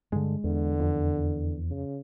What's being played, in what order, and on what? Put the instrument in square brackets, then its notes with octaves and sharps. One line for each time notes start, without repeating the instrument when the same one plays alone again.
[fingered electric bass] G2 D3 [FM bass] G#3
[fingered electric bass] E2 [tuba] D3
[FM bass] F2
[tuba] C#3